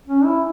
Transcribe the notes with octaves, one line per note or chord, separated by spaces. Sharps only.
C#4
E4